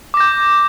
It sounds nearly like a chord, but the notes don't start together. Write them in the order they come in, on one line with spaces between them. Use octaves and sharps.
D6 A#6 G6